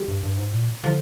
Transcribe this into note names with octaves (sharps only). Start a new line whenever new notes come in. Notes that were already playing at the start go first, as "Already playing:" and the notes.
Already playing: G3
G2
G2
G#2
A#2
D3 F3